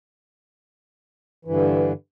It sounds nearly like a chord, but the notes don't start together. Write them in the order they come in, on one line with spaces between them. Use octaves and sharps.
E3 G2 D3